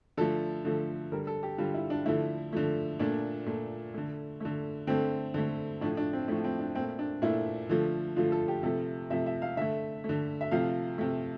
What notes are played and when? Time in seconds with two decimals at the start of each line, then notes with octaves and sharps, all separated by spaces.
0.17 D3 F3 A3 A4
0.65 D3 F3 A3
1.12 D3 G3 A#4
1.27 A4
1.43 G4
1.58 D3 G3 F4
1.74 E4
1.90 D4
2.06 D3 F3 A3 E4
2.53 D3 F3 A3
2.99 A#2 A3 D4
3.46 A#2 A3
3.94 D3 A3
4.40 D3 A3
4.87 D3 A3 C4
5.34 D3 A3
5.81 A2 F3 A3 D4
5.97 D4
6.13 C4
6.28 A2 F3 A3 D4
6.44 C4
6.59 D4
6.75 A#2 A3 C4
6.99 D4
7.22 A#2 A3 E4
7.69 D3 F3 A3
8.16 D3 F3 A3 F4
8.32 A4
8.48 G4
8.63 C3 F3 A3 A4
9.10 C3 F3 A3 E5
9.26 E5
9.42 F5
9.57 D3 A3 E5
10.04 A3
10.09 D3
10.41 E5
10.51 C3 F3 A3 F5
10.98 C3 F3 A3